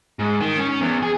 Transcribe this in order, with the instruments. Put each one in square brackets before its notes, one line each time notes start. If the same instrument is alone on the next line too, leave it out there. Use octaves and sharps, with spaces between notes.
[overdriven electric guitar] G#2
D#3
C#4
E2
G#4